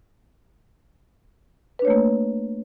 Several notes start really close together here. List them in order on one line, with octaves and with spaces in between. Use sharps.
B4 D4 C#5 A3 A#3